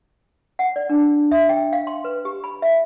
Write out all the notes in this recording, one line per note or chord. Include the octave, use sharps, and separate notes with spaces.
F#5
D5
D4
E5
G5
F5
C6
B4
G4
B5
E5